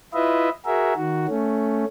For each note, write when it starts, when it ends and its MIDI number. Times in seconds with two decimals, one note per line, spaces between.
0.14 0.49 64
0.14 0.49 65
0.14 0.49 71
0.14 0.49 75
0.14 0.49 76
0.65 0.93 66
0.65 0.93 68
0.65 0.93 70
0.65 0.93 76
0.96 1.26 51
0.96 1.26 66
1.28 1.85 57
1.28 1.85 61